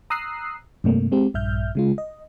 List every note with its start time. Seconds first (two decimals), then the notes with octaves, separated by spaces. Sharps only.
0.10 A#5 D#6 E6 F#6 C7
0.84 G2 C3 A3 A#3
1.12 G#3 C4 G4
1.34 A#1 G2 E5 F6 G6
1.75 C#3 G#3 F4
1.98 D#5